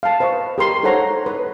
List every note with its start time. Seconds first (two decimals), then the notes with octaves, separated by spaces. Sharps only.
0.03 F5 A5
0.20 B4 C5 D#5 F5 C#6
0.58 G4 A#4 C6
0.83 D#4 A4 C5 C#5 F#5 A#5
1.26 B4